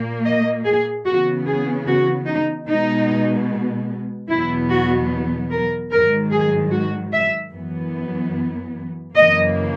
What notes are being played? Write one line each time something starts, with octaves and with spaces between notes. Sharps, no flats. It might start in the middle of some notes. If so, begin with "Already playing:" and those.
Already playing: A#2 A#3
D#5
G#4
C#3 E3 B3 F#4
G#4
F#4
D#4
B2 G#3 B3 D#4
E2 B2 F#3 B3 E4
F#4
A#4
G#2 D#3 F#3 A#4
G#4
F#4
E5
F#2 E3 B3
F#2 C#3 E3 A#3 D#5